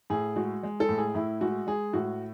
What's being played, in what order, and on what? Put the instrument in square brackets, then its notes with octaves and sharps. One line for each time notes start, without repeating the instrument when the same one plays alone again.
[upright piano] A2 G#4
G#3 F#4
G#3
A4
A2
G#4
A2 E4
G#3 F#4
G#3 G#4
A2 F#4